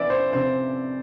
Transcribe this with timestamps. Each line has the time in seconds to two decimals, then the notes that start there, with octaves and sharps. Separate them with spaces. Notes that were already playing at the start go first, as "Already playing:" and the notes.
Already playing: E3 B3 D5 E5
0.10 C5
0.33 C3 C5